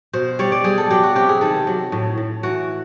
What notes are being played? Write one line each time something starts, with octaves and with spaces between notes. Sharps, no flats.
B2 C5
G3 C#5
D5
G3 G#4
A4
F#3 G4
F#4
C3 G4
G#4
D#3 A4
F#3
A2
A2
E3 F#4